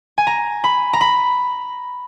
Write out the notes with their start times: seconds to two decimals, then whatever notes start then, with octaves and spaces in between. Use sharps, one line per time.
0.18 G#5
0.27 A#5
0.64 B5
0.93 A#5
1.01 B5